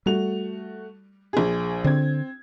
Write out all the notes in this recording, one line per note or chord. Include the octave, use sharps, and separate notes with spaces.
G3 A3 F#4 F7
A#1 G#4
D3 C4 G#6